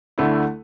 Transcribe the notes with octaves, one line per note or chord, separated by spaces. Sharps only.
D2 D3 A3 E4